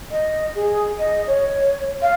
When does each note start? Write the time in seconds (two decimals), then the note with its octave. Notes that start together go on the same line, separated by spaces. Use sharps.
0.11 D#5
0.55 G#4
0.98 D#5
1.26 C#5
2.02 F5